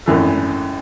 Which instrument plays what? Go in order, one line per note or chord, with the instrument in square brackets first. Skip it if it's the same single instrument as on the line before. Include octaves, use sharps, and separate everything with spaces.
[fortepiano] G#1 F#2 E3 A3